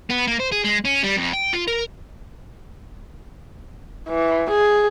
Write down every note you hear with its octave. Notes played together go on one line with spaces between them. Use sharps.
B3
A#3
C5
G#4
G#3
C#4
G3
F2
G5
F4
A#4
E3
G#4